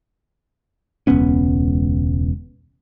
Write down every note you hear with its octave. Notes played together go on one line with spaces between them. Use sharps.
E1 C#2 B3 C#4